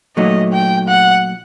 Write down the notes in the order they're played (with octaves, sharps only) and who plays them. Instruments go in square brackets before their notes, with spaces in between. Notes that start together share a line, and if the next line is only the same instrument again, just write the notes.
[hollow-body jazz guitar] A#2 F#3 A3 D#4 [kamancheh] D#5
[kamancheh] G5
F#5